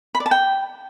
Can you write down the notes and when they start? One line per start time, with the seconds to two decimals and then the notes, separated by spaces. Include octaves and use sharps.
0.15 B5
0.20 D5
0.26 A5
0.31 G5